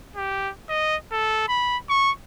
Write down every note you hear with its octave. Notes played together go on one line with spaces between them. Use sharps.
G4
D#5
A4
B5
C#6